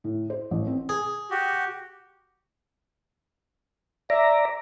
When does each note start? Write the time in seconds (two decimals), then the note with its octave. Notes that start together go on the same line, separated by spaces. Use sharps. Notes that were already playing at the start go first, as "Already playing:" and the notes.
0.04 A2
0.30 C5
0.51 A1
0.67 C4
0.89 G#4
1.31 F#4 G4
4.10 D5 E5 A#5